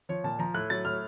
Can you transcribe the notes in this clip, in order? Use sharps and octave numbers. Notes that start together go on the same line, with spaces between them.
F3 C#5
A#2 A5
F3 A#5
A2 F#6
F#3 A6
A2 F6